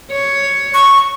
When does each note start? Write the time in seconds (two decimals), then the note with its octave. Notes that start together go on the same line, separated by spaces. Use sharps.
0.12 C#5
0.74 C#6